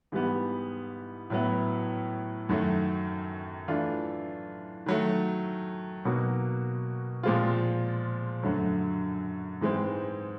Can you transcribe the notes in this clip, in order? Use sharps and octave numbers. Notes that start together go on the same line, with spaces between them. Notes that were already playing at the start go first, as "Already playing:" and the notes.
G#2 E3 G3 B3
A2 F#3 B3 E4
F#2 D#3 F#3 A3
E3 A3 D4 F4
D#3 F#3 A3
B2 F#3 A#3 D#4 F#4
A#2 F3 G#3 C4 F4
F#2 D3 F#3 A3
G#2 E3 G#3 C4